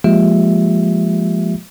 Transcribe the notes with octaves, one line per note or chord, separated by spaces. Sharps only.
F3 G#3 A#3 F4 G4 E5